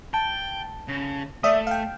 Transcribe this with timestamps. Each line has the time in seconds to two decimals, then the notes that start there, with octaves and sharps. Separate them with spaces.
0.14 G5 A5
0.88 C#3
1.43 A3 D5 E5 D#6
1.67 F5 G5